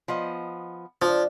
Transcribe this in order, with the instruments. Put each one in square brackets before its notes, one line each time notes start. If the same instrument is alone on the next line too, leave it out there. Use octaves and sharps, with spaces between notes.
[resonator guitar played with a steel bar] F3 B3 D#5
[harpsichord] F3 [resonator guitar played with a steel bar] D4